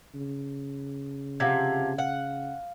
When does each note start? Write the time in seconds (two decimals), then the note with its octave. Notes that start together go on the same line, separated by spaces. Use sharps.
0.14 C#3
1.40 C3 F3 F5 F#5 G#6
1.98 F5 F#5